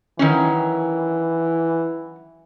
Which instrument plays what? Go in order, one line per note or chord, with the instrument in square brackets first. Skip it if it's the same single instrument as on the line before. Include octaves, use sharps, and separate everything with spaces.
[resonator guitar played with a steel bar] D#3 F#3 C#4 [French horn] E3